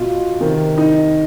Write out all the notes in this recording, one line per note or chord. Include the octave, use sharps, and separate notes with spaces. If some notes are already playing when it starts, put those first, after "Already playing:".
Already playing: B2 F4
C3 D#3
D#4